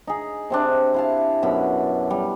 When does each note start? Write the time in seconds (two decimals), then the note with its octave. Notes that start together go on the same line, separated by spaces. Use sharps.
0.07 D#4 G#4
0.50 C3 C4 D4
0.94 E4 F5 A5
1.43 F#2 B2 B5
2.10 G3